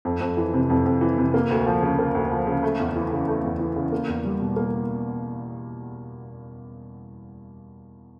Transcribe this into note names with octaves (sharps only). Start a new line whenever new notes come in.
F2
F2
E3
C3
F2
F2
E3
C3
A#3
D2
F3
C#3
A#3
D2
F3
C#3
A3
E2
E3
C#3
A3
E2
E3
C#3
A#3
E2
G3
B2
A#3